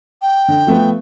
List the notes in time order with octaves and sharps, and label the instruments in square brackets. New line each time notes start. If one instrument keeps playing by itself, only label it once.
[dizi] G5
[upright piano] D3
F3 A3 B3